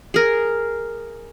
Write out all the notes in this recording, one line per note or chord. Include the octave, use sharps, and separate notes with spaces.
G#4 A#4